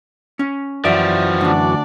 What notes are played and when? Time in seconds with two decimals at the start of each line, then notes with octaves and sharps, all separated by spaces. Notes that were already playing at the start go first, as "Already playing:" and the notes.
0.39 C#4
0.85 F#2 E3 F3 G3 F#4 D5 E5
1.41 D2 G#2 D4 D5